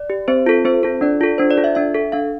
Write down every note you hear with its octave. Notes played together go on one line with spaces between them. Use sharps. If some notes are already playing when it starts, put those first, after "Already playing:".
Already playing: D5
G4
C4 C5
F4 A4
C4 C5
F4 A4
D4 D5
F4 A4
D4 C5
D5
F4 A4
E5
D4 E5
A4
D4 F5